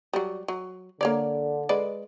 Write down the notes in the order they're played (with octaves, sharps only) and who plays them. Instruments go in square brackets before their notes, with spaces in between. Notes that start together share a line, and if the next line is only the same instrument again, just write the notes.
[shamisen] F#3 G3
F#3
[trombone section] D3 [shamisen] A#3 C#5 D5
[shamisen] G#3 B4 D5